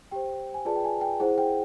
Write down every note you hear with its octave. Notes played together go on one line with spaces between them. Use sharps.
G4 C5 G5
G#5
F4 G#4 B4 D5 A5
G5
G#5
G5
E4 G#4 C5 F#5
G5